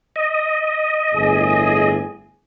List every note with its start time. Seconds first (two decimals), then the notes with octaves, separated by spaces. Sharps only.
0.16 D#5
1.15 G1 A2 G#4